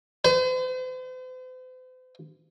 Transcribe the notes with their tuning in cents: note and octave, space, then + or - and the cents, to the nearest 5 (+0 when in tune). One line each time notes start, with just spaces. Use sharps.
C5 -45